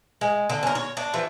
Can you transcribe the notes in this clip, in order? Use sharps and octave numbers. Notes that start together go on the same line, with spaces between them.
G#3
D3
C#4 A#4
C#5
D4
E3 F3